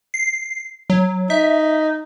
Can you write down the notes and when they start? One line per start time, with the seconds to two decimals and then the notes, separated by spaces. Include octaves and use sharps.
0.14 C7
0.90 F#3
1.30 D#4 E5